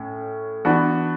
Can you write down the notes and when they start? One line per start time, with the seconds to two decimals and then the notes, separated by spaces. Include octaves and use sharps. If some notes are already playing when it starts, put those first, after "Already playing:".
Already playing: A2 C#4
0.65 E3 B3 D4 F#4